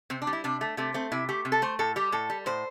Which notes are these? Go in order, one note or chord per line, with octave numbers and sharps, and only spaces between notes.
C3 C4
D4
G3
E4
C3 D4
A3
C3 A3
A3 C4
C3 E4
A3 G4
C3
A4
A3 C5
A2 A4
G3 G4
A2 A4
G3
A2 C5